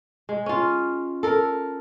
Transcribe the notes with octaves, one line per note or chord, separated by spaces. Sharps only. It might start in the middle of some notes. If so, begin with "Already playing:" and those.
G#3
C#4 F4
A4 A#4